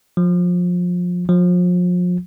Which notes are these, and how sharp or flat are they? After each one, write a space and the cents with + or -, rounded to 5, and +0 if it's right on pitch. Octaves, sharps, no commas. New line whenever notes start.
F3 +25
F3 +35